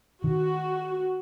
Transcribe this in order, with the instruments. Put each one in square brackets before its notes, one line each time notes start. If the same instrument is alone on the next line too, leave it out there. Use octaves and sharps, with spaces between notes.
[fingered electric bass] D#3 [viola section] F#4